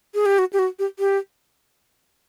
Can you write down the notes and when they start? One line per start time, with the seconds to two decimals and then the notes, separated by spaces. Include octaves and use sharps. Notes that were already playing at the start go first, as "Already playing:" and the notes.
0.14 G#4
0.26 G4
0.39 F#4
0.53 G4
0.59 F#4
0.79 G4
0.99 G4